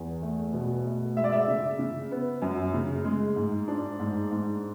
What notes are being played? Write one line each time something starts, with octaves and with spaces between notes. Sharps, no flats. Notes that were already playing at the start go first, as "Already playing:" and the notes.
Already playing: E2
A3
B2
A3
G#3 E5
D5
E5
C#3
C#3
B3
F#2
C#3
G#3
G#2
D4
G#2
G#2